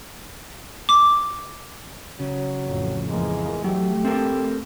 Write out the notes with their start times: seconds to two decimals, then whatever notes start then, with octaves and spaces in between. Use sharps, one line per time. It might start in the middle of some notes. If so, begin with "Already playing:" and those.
0.89 D6
2.20 C#3 F#3
2.66 A1 F2
3.10 F2 E3 G#3 A#3
3.64 F#3 A3 G4
4.05 C4 A4 A#4